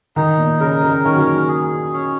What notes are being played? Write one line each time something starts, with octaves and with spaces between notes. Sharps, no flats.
D#3 D#4
A#2
C#3 A#4
C#3
D#3 C#4
F#3
D#3
G#4
C#4